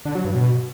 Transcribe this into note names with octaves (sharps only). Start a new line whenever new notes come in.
D3
F#3
G2
B2